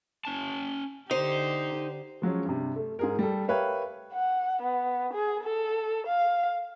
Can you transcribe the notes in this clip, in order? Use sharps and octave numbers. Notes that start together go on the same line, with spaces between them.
C#4 A5
D3 D#4 G4 C5
F3 F#3 G#3 C#4
G2 C3
A3
G#2 G#4 A#4
G3 A4
G4 A#4 B4 C#5 E5 F5
F#5
B3
G#4
A4
F5